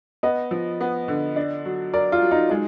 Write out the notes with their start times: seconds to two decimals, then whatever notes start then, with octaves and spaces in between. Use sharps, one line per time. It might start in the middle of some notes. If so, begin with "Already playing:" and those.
0.23 B3 D#5
0.51 F3
0.81 B3
1.08 D3
1.36 D4
1.65 F#3
1.93 A#4 D5
2.12 F4
2.22 F#3
2.31 D#4
2.50 G#3 D#4